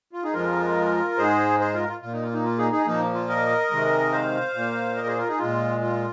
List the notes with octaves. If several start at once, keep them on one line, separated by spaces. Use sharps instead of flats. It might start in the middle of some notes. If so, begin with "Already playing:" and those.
F4
D#4 G#4
F2 F3 G#3 F4 A#4
G#2 G#3 G#4 C5
G#4 C5
F4 A#4
F4
A#2 A#3 F4
D#4
F4
D#4
F4
D#4 G#4
D#4 G#4
A#2 F3 A#3 D#4
F4
A#4 D#5
C3 D#3 G#3
C5 F5
A#2 A#3
A#4 D#5
G#4 C5
F4 A#4
D#4 G#4
A#2 G#3 F4
F4